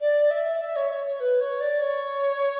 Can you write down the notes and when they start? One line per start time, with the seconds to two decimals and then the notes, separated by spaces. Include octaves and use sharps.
0.01 D5
0.30 E5
0.60 E5
0.76 C#5
0.90 C#5
1.06 C#5
1.20 B4
1.40 C#5
1.60 D5
1.81 C#5